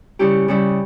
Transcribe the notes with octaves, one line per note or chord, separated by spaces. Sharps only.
C#3 G3 C#4 E4 G4
C#3 G3 C#4 E4 G4